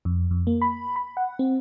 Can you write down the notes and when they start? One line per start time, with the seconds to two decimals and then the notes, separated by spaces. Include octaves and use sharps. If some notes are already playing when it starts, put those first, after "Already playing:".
0.05 F2
0.31 F2
0.47 A#3
0.62 B5
0.96 B5
1.17 F#5
1.39 C4